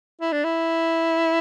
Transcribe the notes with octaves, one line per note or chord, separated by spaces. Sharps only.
E4
D4
E4